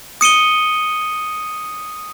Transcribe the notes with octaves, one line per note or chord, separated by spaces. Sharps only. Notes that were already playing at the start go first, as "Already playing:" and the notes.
D#6 C#7 D#7 G7